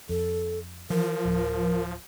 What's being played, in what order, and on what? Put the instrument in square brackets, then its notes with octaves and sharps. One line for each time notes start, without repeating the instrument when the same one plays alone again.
[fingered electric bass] F2 [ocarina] A4
[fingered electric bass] E3 [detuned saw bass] F3 [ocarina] A#4
[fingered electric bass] D1